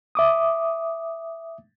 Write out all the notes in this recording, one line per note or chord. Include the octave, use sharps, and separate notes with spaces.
E5 D6 D#6